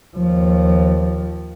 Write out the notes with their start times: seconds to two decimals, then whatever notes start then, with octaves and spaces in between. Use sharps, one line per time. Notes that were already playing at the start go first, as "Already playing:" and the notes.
0.17 D#2 F3